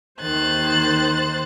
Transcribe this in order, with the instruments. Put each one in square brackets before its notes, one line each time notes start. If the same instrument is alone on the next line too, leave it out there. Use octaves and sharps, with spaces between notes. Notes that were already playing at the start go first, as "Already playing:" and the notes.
[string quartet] D#2 D#3 C5 F#6 A6